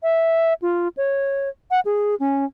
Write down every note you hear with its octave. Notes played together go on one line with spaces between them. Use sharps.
E5
F4
C#5
F#5
G#4
C#4